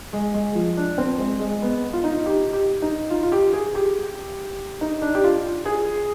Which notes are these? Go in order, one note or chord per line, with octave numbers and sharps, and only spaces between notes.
G#3
G#3
F3
D4
C4
G#3
G#3
B3
F4
D#4
G4
G4
D#4
F4
F4
G4
G#4
G4
D#4
D4
G4
F4
G#4